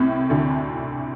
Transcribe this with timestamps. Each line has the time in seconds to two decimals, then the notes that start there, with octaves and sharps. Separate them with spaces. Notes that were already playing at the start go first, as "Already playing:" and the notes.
Already playing: C2 A2 C3
0.30 D2 D3